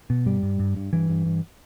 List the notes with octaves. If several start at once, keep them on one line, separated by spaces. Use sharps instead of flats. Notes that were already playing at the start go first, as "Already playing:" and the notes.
B2
G2 G3
G2
G2
G2
G2 E3
G2
G2